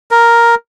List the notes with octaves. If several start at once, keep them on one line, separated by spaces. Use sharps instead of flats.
A#4